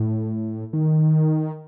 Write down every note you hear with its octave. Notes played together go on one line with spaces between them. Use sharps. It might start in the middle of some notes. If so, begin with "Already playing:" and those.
Already playing: A2
D#3